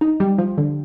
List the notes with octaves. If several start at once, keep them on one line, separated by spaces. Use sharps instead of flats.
D#4
G3
F3
D3